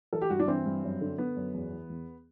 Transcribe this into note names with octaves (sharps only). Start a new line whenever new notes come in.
E3 A4
G4
G2 F#4
D4
E3 C4
G2
F#2
D3
D3 B3
F#2
E2
E3
E2